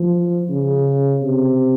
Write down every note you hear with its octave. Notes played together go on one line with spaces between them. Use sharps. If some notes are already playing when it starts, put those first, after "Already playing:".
Already playing: F3
C#3
C3